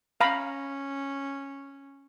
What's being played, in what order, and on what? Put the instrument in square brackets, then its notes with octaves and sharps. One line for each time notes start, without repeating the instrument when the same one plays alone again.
[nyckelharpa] C#4 [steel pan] F5 A#5 B5